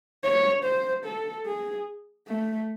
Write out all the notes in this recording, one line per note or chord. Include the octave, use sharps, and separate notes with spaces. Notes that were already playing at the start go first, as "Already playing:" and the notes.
C#5
C5
A4
G#4
A3